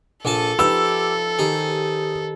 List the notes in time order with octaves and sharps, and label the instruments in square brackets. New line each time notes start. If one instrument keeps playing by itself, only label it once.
[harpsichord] A#1 G#5 A5 [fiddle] A4
[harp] F3 D#4 B4 [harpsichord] G4 [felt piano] E6
[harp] D#3 G4 C5 [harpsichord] G#4